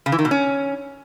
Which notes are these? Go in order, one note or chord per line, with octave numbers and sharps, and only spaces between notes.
C#3
E3
D#3
B2
C#4